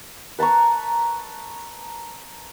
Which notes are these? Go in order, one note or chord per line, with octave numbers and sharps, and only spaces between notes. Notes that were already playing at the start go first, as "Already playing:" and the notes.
B4 A5 A#5 C#6